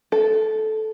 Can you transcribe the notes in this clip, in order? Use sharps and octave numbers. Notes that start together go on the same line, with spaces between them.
A4